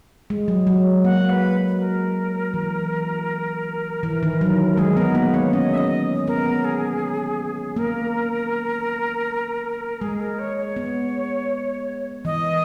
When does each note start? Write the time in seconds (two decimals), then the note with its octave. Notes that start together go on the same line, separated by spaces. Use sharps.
0.30 G#3
0.48 F#3
0.67 F#3
1.04 A#3 F#5
1.30 B4
1.79 A#4
2.54 E3
4.03 E3
4.23 D#3
4.41 F#3
4.73 A#4
4.77 G#3 G#4
4.97 B3 A#4
5.15 A#3 B4
5.34 B3 C#5
5.53 C#4 D#5
5.74 E5
5.77 D#5
6.27 B3 A#4
6.65 G#4
7.76 A#3 A#4
10.01 G#3 G#4
10.20 A#4
10.39 C#5
10.57 C#5
10.76 B3
12.25 E3 D#5